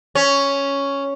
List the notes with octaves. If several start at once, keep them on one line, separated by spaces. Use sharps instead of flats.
C#4